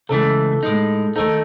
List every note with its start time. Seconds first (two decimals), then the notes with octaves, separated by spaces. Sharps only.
0.09 C#2 C#3 E3 A3 A4
0.63 A2 G#3 D#4
1.16 D#3 A3 D#4 A4